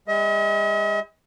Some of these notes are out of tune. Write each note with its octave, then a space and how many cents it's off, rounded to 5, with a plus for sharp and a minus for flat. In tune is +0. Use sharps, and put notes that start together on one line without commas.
G#3 -45 D#5 +45